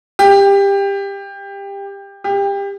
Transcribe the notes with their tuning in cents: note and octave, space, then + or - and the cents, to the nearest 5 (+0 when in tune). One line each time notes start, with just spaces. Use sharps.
G4 +20
G4 +25